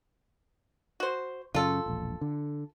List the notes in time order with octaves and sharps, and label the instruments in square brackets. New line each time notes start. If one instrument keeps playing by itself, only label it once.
[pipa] F#4 C5
[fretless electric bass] F#2 C#3 [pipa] F4 A4
[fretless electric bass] E1 A#1
D3